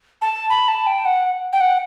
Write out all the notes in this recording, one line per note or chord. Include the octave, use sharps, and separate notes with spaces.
A5
B5
A5
G5
F#5
G5
F#5